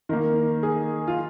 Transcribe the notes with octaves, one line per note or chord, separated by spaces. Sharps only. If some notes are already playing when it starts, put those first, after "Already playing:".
D#3 A#3 A#4
G#4
F4